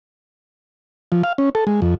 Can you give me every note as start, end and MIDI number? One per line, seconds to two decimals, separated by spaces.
1.12 1.22 53
1.23 1.33 77
1.38 1.49 61
1.55 1.64 69
1.67 1.80 56
1.82 1.95 41